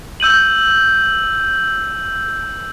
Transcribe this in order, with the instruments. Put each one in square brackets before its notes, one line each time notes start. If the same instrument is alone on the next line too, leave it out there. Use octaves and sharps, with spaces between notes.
[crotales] E6 G6 D#7 F#7